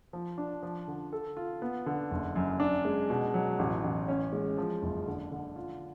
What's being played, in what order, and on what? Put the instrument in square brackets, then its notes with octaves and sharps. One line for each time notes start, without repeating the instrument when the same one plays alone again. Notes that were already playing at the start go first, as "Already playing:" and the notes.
[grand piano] F3
D4
F3
D3
A4
F4
B3
D3
F#1
F#2
D4
G#3
B2
F#3
A1
A1
C#4
G#3
F3
F#1
D3
D3
F4